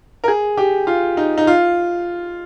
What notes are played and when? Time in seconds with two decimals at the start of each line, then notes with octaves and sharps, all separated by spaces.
0.24 A#4
0.28 G#4
0.57 G4
0.87 F4
1.17 D#4
1.38 D#4
1.47 F4